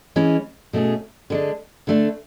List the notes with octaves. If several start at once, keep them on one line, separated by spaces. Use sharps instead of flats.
E3 G#3 C#4
B2 A3 C#4 G#4
D3 G#3 D4
D3 A3 D4